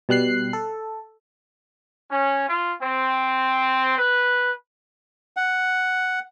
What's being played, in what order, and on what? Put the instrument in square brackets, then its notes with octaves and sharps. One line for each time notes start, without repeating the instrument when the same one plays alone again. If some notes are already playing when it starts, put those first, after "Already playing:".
[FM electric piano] B2 G3 F#6 C7
A4
[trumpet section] C#4
F4
C4
B4
[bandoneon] F#5